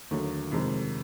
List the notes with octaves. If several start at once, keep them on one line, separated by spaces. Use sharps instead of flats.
D#2 D3 F#3 A3
F2 C3 D#3 G#3